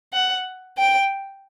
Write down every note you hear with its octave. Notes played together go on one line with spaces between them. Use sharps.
F#5
G5